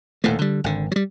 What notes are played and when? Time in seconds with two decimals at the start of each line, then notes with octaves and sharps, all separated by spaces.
0.24 D#1 D#2 A2 A3
0.39 D3 G3
0.64 G#1 D3
0.92 F#3 G3